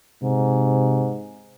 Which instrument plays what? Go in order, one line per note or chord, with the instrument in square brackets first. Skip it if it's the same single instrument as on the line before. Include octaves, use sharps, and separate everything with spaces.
[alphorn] G#2 [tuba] C3